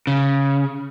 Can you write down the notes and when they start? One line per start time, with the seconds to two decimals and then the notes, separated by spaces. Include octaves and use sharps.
0.07 C#3